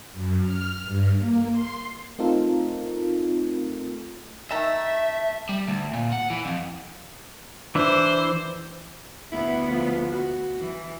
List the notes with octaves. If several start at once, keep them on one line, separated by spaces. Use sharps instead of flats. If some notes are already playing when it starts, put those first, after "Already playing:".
F#2
F6
G2
A#3
C6
A3 C4 D#4 F4 A4 A#4
D#3 A3 E5 A5
G3
D2
A#2
F#5
E3
F2
E3 D4 E4 C5
D2 B3 E4
F3
F#4
E3